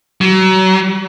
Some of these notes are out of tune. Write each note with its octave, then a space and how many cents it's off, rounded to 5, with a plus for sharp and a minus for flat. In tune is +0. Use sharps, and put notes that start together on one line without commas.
F#3 +30